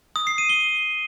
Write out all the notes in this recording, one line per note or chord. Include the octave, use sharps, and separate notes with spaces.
D#6
C7
D#7
G7